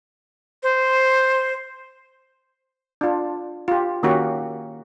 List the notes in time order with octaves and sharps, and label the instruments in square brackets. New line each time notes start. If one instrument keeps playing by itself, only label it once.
[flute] C5
[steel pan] D4 F4
F4 G4
D#3 A#3 C#4 F#4 G4